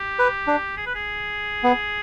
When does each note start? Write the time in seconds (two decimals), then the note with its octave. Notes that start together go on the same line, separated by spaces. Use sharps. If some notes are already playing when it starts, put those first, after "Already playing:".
Already playing: G4
0.19 B4
0.47 D4
0.77 G#4
0.86 B4
0.95 G#4
1.64 B3